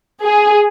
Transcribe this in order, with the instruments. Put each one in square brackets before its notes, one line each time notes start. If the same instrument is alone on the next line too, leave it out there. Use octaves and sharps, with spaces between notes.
[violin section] G#4